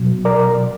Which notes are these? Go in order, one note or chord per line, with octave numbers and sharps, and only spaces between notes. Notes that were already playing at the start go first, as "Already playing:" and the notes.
Already playing: B2 F#3
A#4 D5